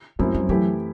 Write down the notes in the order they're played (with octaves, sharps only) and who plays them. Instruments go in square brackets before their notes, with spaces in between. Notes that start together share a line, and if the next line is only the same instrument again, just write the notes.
[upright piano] F#2 F#3 C4 E4 [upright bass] A3
[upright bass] G3
[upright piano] E3 A3 E4 G4 [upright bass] F#3